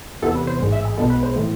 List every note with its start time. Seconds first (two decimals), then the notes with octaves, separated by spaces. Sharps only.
0.22 E2 C3 E3 B3 A4
0.35 B4
0.47 C5
0.61 A1 G#2 G#3
0.72 E5
0.85 G#4
0.98 B1 B2 G#3 B3 A4
1.10 B4
1.23 C5
1.36 A2 E3